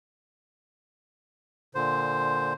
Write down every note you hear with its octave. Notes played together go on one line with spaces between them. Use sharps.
A#2 D3 C5